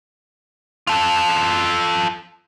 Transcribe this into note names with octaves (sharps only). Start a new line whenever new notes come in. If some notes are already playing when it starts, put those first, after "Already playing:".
F4 A4